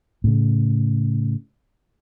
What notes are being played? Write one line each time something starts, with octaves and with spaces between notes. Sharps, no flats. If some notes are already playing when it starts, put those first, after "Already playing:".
A2 C#3